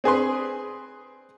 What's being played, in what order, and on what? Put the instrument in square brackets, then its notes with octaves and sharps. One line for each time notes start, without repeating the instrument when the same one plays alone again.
[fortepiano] C4 G#4 B4 C6